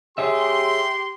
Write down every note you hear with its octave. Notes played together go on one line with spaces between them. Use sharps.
G4 G#4 C#5 E5 C6